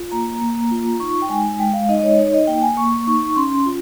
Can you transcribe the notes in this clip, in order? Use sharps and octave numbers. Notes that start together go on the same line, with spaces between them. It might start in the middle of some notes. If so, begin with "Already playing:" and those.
Already playing: F4
A#3 A#5
A#3
F4
D#4 C#6
G5
G#3 G#5
G#3 G5
F5
D#4 D#5
D#5
C#5
D#4 C#5
D#5
A#3 G5
G#5
A#3 C#6
D#4 C#6
C#4 C6
F4